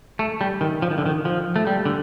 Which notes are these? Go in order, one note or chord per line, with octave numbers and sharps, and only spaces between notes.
A3
G3
D#3
F3
D#3
D3
D#3
F3
A3
G3
D3